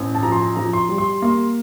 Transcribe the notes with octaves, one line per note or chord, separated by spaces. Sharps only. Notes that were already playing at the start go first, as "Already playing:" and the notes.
Already playing: A1 C4
A5
F3 A#5
C6
A#5
F3 A#5
C6
G3
C6
A#3 C6